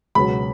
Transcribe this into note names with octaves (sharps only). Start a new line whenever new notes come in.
C#2 B2 F#3 B5